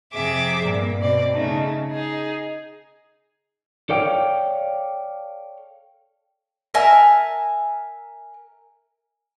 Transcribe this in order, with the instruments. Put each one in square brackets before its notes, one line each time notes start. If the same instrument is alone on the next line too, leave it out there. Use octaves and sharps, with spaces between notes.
[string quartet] F2 C3 G#4 E5 D6
G2 A#2 A#3
B2 C4 D5
C#3 A3 D#4
D#4 G#4
[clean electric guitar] A4 C#5 D5 F5 G5
[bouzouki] A#4 E5 G#5 A5